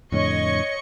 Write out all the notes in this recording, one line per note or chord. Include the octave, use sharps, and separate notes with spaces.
F2 A2 D3 C#5 D#5 C#6 C#7